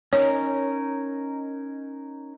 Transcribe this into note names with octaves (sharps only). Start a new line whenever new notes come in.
C#4 D#4 A#4 C#5